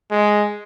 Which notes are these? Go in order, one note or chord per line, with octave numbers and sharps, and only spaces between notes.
G#3